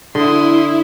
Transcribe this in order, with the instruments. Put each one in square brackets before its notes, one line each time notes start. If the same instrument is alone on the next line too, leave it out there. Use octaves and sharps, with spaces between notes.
[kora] D3 [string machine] E4 [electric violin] C6 D#6